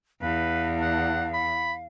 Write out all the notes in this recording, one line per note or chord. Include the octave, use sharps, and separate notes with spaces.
E2 B4 F5
F#5
B5